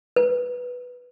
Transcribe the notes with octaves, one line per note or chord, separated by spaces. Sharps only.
B4